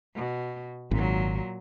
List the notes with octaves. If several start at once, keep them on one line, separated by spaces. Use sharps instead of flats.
B2
G#1 A#2 F#3